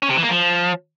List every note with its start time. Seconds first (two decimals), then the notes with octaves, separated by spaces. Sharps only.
0.02 C#4
0.09 C3
0.16 E3
0.23 A#3
0.30 F3